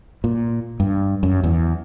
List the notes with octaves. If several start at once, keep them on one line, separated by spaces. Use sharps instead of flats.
A#2
G2
F#2
E2